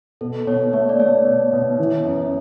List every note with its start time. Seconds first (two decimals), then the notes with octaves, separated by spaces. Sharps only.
0.21 B2 A4
0.47 B2 C#5
0.73 A3 C#5
0.89 D5
1.00 A3 C#5
1.27 B2
1.53 B2
1.79 E3
2.05 F#2